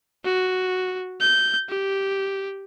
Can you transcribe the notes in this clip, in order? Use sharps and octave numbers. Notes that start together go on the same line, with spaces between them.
F#4
G6
G4